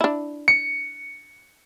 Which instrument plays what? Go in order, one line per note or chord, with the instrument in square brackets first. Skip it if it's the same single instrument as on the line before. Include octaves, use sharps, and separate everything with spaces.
[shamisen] D4 E4
[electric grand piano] C#7